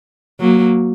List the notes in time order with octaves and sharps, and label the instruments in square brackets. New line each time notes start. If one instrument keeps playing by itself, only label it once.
[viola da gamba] F#3 A#3